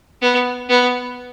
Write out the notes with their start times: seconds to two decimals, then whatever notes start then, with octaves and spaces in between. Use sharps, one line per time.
0.22 B3
0.69 B3